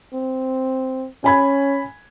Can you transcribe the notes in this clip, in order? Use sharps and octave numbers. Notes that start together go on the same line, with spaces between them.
C4
C#4 G#5 B5 G#6